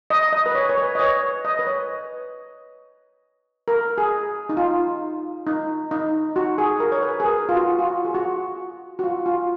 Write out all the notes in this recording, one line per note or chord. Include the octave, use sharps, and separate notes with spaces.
D#5
D#5
B4
C#5
C#5
B4
D#5
C#5
D#5
B4
C#5
A#4
G#4
D#4
F4
D#4
D#4
F#4
G#4
A#4
C#5
B4
G#4
A#4
F4
F#4
F4
F#4
G#4
F#4
F#4
F4
F4